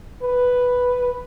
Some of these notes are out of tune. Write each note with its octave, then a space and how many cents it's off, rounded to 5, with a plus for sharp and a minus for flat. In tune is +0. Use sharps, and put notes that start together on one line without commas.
B4 +0